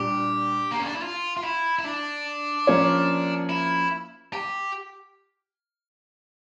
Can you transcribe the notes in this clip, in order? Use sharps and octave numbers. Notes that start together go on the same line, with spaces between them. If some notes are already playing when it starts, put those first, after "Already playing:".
Already playing: A#2 G3 D4 G4
A#3
C#4
D4
E4
F4
F4
E4
E4
D4
F3 A#3 C#4 F4 C#5
E4
G4